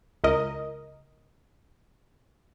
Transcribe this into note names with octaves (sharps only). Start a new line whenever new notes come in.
C#2 A#4 D#5